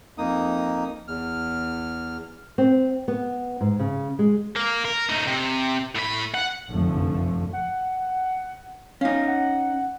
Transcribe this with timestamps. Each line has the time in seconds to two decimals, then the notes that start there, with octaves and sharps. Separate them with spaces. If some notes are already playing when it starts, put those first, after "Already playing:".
0.18 F2 A#3 D#4 D#6
1.08 E2 F6
2.58 C4
3.08 B3
3.61 G#2
3.79 C#3
4.19 G#3
4.56 A#3
4.85 A#4
5.09 A3 D#4
5.27 C3
5.95 A2 B5
6.34 F#5
6.69 F1 A#1 F#2 D3 F3 A3
7.53 F#5
9.01 C#4 D#4 F5
9.28 F#5